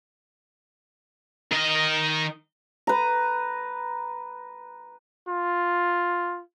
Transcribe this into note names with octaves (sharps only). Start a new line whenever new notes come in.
D#3 D#5
B4 A#5
F4